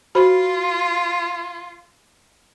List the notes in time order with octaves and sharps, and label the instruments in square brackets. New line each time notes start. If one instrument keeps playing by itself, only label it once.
[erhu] F4 [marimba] F#4 C5 B5